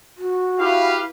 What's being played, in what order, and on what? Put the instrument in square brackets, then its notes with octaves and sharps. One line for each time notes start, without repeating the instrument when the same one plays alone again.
[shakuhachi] F#4
[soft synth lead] E4 [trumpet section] G4 B4 F5